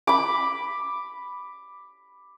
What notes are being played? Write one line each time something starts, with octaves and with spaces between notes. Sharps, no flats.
B5 D6